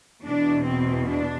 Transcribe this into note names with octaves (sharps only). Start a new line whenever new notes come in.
E2 B2 D4
C4
D4